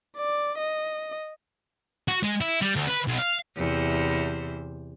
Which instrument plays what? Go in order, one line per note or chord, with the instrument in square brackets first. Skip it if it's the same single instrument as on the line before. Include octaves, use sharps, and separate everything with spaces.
[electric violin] D5
D#5
[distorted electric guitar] F#4
G#3
E4
G3
D2
B4
B1
F5
[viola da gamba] E2 C3 C5